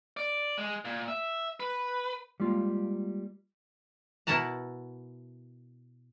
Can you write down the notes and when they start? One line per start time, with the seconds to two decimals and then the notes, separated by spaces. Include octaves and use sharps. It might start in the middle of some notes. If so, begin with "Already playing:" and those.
0.17 D5
0.58 G#3
0.85 A#2
1.08 E5
1.60 B4
2.40 G3 G#3 A#3 F4
4.27 B2 E4 A#4 F#5 A5 A#5